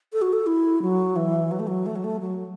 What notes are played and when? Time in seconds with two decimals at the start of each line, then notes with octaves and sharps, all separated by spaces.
0.13 A4
0.22 F#4
0.33 A4
0.46 E4
0.82 F#3
1.16 E3
1.51 F#3
1.60 A3
1.67 F#3
1.86 A3
1.96 F#3
2.04 A3
2.20 F#3